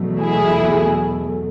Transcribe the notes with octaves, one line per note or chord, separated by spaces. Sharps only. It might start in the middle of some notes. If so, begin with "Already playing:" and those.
Already playing: E2 B2 F#3 A3
E4 G#4